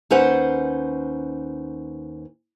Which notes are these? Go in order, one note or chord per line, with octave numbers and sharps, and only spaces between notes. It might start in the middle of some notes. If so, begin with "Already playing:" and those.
D#2 C#4 D#4 B4 C5 F#5